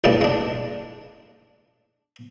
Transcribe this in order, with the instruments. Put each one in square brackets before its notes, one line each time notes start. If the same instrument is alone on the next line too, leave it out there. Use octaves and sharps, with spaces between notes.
[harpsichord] A1 G2 A#2 C#3 A5
G#3 D4